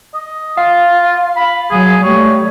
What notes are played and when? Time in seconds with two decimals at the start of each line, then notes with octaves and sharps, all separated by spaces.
0.14 D#5
0.57 F4 F5
1.36 B5
1.71 F#3 G#4
2.03 G3 A3 C#5